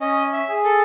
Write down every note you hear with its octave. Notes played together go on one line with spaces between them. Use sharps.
C#4 D#5
E5
G#4
A4